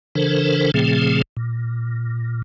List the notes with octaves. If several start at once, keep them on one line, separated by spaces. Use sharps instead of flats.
C#3 E3 D4 A4 A#4 C5
A#2 C#3 F3 A3 C4 G#4
A#2